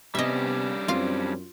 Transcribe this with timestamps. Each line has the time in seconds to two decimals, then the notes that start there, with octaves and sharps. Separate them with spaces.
0.15 C3 G3 B3 C#4 D4 D#5 E5
0.88 F#2 C4 F4 F5